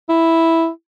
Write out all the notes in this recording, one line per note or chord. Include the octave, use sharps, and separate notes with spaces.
E4